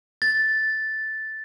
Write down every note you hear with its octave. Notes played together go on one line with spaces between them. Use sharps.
A6